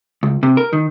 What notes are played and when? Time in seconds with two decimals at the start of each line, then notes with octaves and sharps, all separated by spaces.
0.23 C#2
0.43 C3
0.57 A#4
0.73 D#3